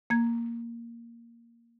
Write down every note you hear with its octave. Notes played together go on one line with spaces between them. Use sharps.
A#3 G#6